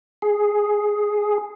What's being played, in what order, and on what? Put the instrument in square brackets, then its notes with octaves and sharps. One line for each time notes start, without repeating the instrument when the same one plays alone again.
[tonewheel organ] G#4